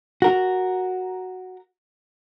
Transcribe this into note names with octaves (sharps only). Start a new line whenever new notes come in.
F#4 A#4